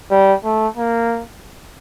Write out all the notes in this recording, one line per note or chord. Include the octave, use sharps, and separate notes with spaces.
G3
A3
A#3